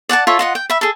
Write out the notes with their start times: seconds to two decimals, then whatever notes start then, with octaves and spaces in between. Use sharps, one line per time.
0.09 D5 F#5 G#5 A5
0.27 F4 A4 C#5 E5
0.39 F4 D#5 F#5
0.55 G5
0.70 E5 B5
0.81 G#4 A4